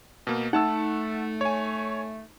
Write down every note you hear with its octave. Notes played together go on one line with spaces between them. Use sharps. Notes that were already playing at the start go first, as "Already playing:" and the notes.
B2 A#3
A3 D#4 F#5 A5 E6
C#5 G#5